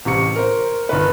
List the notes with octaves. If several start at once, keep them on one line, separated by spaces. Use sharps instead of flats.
A1 C3 C#6 C#7
A#4 C5
G1 D#3 B4